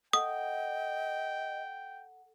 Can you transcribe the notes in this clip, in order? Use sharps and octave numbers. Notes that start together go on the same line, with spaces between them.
A4 D#5 F#5 G5 D#6